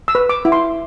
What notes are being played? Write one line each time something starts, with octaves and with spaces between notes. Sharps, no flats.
E6
B4
D6
E4
C6